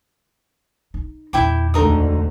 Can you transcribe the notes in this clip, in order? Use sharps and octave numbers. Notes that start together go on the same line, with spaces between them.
D#4
E2 A#2 E4 G5 D6
G#1 D2 D3 D#4 A#4 D#6